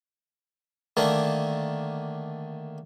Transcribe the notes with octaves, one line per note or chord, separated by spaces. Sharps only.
D3 D#3 A3 A#3 D4